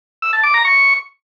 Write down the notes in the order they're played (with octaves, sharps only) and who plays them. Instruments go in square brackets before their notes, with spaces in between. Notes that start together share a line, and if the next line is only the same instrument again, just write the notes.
[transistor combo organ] E6
A5
D6
A#5
C#6